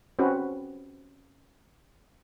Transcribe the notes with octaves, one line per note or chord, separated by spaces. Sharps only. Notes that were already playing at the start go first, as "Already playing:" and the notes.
C4 C#4 F#4 B4